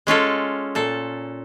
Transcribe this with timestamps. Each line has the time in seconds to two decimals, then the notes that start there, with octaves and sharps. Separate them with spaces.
0.07 G#3 C#4 F4 A4
0.75 A#2 A4